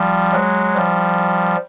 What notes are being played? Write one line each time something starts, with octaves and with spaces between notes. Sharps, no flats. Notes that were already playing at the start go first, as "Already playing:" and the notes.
Already playing: F3 G3
F#3 G#3
F3 G3